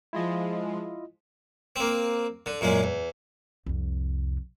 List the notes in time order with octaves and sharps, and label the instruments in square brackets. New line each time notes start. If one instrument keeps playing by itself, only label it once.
[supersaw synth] F3 G#3 [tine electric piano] E4 F4 D#5
[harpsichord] A#3 C4
D3
F#2 A#2 G#3
E2
[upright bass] C2 F2